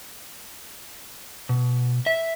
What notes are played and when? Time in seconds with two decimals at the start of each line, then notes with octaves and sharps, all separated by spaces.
1.49 B2
2.06 E5